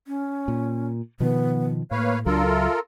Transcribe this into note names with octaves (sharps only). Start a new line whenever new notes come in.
C#4
A#2
B2 D#3 F3 B3
A2 A#3 B4 C#5 F5
C#2 F#3 D4 F4 A4 A#4
E5